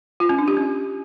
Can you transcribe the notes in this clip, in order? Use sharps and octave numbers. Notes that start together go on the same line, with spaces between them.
F4
C#4
D4
G4
C#4